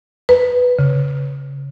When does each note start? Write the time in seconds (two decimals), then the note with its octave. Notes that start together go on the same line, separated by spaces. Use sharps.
0.29 B4
0.79 C#3